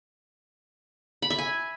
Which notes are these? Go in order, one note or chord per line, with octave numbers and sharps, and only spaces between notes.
B5
E5
G#5